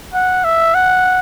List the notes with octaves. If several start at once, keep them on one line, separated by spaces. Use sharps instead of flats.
F#5
E5
F#5